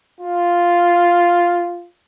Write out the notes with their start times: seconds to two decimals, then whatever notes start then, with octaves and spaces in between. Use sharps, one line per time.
0.20 F4